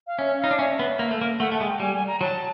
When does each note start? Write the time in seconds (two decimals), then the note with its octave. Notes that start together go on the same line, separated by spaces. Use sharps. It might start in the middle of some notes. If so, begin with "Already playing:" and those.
0.07 F5
0.18 C#4 E5
0.39 D#4 F5
0.51 D4
0.59 C#4 E5
0.79 B3
0.99 A#3
1.11 A3
1.21 A#3
1.40 A3 F#5
1.52 A3 F#5
1.60 G#3
1.67 G5
1.80 G3 G#5
1.94 G#5
2.07 A#5
2.21 F#3 A5